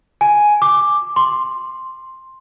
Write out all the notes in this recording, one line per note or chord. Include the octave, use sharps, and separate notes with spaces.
G#5
D6
C6